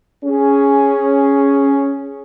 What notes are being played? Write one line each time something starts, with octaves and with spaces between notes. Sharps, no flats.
C#4 G#4